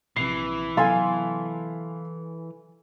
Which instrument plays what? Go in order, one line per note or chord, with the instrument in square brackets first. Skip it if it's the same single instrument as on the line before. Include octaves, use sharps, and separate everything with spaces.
[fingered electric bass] A#1 C3 [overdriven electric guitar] E3 [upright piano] C7
[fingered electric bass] C3 F#3 B3 [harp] A4 G#5 [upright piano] F5 C6